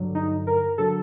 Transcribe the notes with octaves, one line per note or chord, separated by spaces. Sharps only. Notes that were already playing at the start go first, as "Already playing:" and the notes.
Already playing: G2 D3 F#3
D#4
A#4
D3 F#3 A4